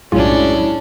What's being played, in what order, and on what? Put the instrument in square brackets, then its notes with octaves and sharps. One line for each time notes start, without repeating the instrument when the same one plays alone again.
[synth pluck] B1 A2 F4 [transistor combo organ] F#2 G#3 [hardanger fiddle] C#4 D4 [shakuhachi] E4